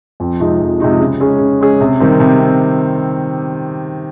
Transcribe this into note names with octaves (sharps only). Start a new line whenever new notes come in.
F2
C3 F3 G#3 D#4
F2
C3 F3 G#3 D#4
C#3
G#3 C#4 G#4
C#3
G#3 C#4 G#4
C3
D#3 G3 C4
C3
C4